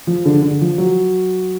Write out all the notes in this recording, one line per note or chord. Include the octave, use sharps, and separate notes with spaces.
F3
D3
D3
F3
F#3